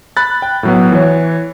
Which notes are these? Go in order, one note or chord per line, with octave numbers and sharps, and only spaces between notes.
B5 F#6 A6
G5
A2 F#3 B3
E3 C#5